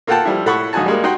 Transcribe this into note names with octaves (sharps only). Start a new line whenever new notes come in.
A#3 F4 A4 F#5 G5 A5
F3 G3 E4
A2 A4 F#5 B5 C#6
A#1 D#4 F#4 G#5 A5
G3 G#3 A#3
D#4 F#4 D#5 G5 C6